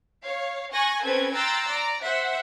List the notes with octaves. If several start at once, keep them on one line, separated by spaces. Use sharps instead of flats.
C#5 F5
G#5 C#6 F#6 G#6 A#6
C4 C#4 A4 B4 G#6
G5 A#5 C6 E6 F#6 A6
D5 A#5
C5 E5 F#5